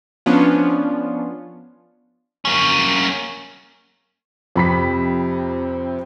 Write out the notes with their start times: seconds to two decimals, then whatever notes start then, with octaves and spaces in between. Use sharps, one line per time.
0.26 F3 B3 C#4 D4 F4
2.45 A#3 C#4
4.56 F2 C3 B5 B6